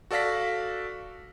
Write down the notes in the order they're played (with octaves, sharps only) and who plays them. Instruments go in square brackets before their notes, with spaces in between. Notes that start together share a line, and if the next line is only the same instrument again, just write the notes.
[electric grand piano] F#4 A4 D5 F5 A#6 B6